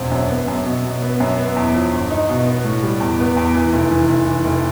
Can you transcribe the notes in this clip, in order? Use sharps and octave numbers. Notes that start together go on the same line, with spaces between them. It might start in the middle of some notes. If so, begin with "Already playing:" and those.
Already playing: E1 C4
F#2
B3
F#2
B2
B2
B3
F#2
B3
E2
F3
G1
D#4
B2
B3
A2
G3
E2
B3
E2
E3
F1
E3
F1
E3
F1